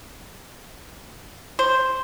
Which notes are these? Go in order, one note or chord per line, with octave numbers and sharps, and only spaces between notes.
C5